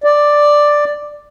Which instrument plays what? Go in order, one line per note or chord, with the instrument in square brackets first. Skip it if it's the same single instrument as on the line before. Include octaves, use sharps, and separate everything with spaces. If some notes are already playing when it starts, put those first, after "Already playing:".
[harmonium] D5